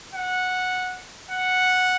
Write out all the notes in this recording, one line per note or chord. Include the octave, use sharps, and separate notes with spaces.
F#5
F#5